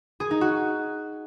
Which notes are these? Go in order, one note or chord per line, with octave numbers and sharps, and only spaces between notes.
G#4
D#4
F#4